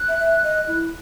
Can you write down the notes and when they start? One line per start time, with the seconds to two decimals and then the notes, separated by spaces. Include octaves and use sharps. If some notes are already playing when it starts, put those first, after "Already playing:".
Already playing: F#6
0.08 E5
0.18 E5
0.43 D#5
0.68 E4